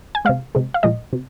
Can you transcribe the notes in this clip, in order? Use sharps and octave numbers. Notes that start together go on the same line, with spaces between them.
G#5
C3 G#3 F5
C3 G#3
F5
A#2 F3 G#3 D#5
C3